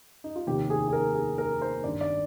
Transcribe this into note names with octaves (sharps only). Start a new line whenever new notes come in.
D#4
F4
F1 D#2 D#3 G4
G#4
G#4
A#4
G#4
A#4
C5
G#1 G2 D#3 D5
D5